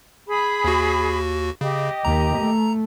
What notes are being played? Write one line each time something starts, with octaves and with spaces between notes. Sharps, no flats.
G#4 B5
D#2 F#4
C#3 G4 D#5
D#2 A#5
A3